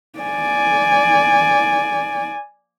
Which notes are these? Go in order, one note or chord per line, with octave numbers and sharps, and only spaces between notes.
D5 G#5